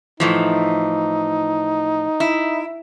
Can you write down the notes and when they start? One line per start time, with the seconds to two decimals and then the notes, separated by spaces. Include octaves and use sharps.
0.20 A2 E3 F3 D#4
2.20 E4